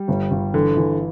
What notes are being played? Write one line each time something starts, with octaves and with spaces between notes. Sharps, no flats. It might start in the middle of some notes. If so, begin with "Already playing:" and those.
Already playing: G3
G1
G1
D3 E3
E3